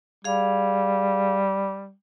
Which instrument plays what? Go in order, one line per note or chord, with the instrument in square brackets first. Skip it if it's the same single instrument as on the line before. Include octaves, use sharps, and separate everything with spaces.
[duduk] G3 [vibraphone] G#4 F5